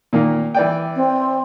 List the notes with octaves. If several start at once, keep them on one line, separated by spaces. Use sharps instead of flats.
A#2 D#3 A#3
E3 D5 G5
C4